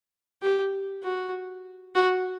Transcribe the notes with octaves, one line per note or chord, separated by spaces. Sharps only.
G4
F#4
F#4